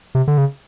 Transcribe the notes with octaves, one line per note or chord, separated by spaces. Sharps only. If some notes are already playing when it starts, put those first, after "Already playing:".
C3
D3
C#3